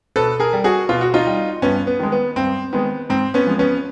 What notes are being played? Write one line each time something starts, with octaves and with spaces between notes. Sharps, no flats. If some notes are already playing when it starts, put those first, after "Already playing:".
B2 A4 B4
G#4 A#4
G3
F#4 G#4
B2 F4
F#4
D#4 F4
G3
G2 B3 C#4
B3
D#3 G#3
B3
G2 C4
D#3 G#3 B3
G#2 C4
B3 C#4
F3 G#3
B3 C#4